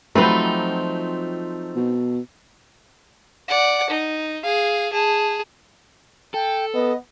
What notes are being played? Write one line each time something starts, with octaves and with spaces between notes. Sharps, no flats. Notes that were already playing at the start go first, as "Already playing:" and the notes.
F3 F#3 A3 C4 D#4 B4
B2
D5 F#5
D#4
G#4 F5
G#4 A5
A4 G5
B3 D#5